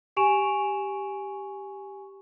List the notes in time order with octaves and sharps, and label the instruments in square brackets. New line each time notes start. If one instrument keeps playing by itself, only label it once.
[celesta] G4 G#5 C#6 D7 E7 F7